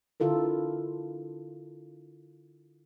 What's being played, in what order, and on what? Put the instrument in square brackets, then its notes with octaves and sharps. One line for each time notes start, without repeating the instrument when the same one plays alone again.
[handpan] D3 E4 F4 A4 A#4